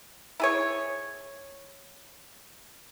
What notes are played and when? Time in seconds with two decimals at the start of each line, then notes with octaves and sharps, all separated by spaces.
0.40 E4 G#4 C#5